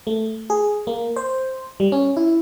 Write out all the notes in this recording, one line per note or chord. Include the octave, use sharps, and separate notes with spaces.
A3
G#4
A#3
C5
G3
C#4
E4